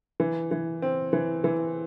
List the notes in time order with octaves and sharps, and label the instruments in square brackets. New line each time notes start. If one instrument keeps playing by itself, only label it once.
[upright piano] E3
E3
C4
E3
E3